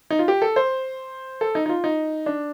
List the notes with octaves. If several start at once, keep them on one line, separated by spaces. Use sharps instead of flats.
D#4
F4
G4
A4
C5
A4
D#4
D#4
F4
D#4
D4